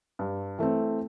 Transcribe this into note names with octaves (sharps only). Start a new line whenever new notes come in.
G2
E3 A3 C4